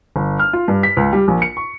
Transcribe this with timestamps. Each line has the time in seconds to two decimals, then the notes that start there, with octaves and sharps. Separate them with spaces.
0.16 G1
0.39 F6
0.53 F4
0.68 G2
0.83 B6
0.97 C#2
1.13 G3
1.28 A#1
1.42 C#7
1.57 C#6